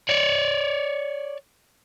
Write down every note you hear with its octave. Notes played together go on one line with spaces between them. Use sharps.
C#5 D5